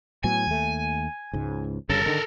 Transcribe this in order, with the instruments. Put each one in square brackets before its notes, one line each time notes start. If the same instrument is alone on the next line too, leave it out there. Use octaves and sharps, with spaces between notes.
[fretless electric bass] A2 F#3 B3 [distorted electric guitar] G#5
[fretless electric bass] D#2 A3
C#2 G#2
[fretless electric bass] G1 G2 C#3 [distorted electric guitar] A4 A#4
[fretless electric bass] D3 D#3